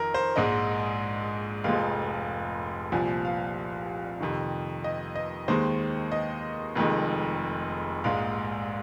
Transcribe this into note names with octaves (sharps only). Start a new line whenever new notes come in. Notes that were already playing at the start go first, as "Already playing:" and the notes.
Already playing: F2 D#3 A#4
C5
A#1 G#2 G#3 D#5
F1 F2 F3 G#3 F5
C2 A#2 F3 G#5
F5
F2 C3 D#3
D#5
D#5
D#2 D#3 G#3 C5
D#5
F1 F2 D#3 G#3
A#1 G#2 G#3 F5